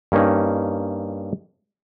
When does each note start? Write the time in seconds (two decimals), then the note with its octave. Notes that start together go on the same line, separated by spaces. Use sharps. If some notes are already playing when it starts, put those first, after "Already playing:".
0.12 G2 A#3 C#4 D#4